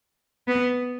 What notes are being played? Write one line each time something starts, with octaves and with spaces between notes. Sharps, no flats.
B3